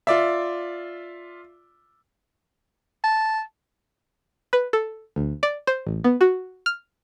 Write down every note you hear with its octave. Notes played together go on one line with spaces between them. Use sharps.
F4 D5 E5
A5
B4
A4
D2
D5
C5
A1
B3
F#4
F6